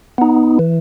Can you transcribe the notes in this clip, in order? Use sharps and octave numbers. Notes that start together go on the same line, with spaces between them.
B3 D#4
E3